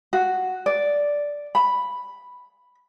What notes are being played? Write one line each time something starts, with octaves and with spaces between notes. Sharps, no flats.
F#4
D5
B5